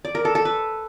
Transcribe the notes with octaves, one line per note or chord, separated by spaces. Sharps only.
D5
A#4
A4
A4
B4